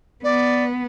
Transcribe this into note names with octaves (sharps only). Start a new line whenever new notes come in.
B3 D5